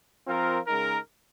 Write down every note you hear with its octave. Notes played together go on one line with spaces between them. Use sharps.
F3 C4 F4 A#4
C#3 G#3 D#4 A#4